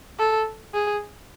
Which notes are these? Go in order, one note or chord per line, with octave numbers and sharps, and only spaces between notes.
A4
G#4